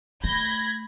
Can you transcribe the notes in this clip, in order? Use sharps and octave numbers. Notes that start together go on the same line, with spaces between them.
A3 B5 G6 G#6 A#6